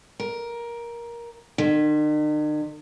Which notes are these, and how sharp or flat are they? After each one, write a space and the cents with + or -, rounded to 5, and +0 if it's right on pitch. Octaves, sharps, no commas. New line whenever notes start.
A#4 +15
D#3 -45